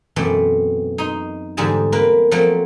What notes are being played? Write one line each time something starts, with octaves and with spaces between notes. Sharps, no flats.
F#2 B2 E3 A3 C4
D#4 C6
E2 G#2 D3 G3 G#4 A5
A#3 C4 A#4 B4
F3 F#3 A3 A#3 C4